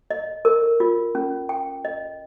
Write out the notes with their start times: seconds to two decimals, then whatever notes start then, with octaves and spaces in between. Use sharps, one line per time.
0.11 D#5
0.45 A#4
0.80 F4
1.15 C#4
1.49 G5
1.85 D#5